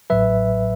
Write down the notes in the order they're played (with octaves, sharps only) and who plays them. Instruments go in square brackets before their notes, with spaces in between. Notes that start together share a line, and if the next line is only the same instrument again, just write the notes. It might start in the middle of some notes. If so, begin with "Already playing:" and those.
[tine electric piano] A1 A2 F#3 B4 E5